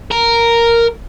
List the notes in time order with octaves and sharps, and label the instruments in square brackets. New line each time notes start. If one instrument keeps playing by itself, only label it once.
[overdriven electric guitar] A#4